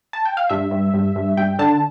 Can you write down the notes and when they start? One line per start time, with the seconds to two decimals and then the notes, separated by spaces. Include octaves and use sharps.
0.13 A5
0.25 G5
0.37 F5
0.49 G2 E5
0.71 G2
0.94 G2
1.16 G2
1.37 G2 G5
1.59 D3 A5